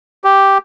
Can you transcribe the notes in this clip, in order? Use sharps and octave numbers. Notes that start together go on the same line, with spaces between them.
G4